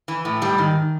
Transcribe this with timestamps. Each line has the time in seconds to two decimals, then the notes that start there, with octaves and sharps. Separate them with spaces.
0.08 E3
0.25 A2
0.42 G#2 G3
0.58 D#3